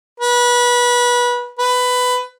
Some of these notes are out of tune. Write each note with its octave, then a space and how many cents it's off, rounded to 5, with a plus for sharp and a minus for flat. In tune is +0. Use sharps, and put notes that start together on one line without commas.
B4 -25
B4 +15